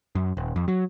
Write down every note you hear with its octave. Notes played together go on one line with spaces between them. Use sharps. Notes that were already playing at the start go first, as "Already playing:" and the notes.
F#2
D#1
F2
F#3